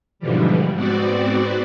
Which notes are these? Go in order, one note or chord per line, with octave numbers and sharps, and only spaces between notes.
G#2 B2 D3 E3 F3 G3
G#2 B3 C4 F#4 D5